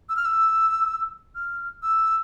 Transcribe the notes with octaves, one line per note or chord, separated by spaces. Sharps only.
E6
F6
E6
F6
E6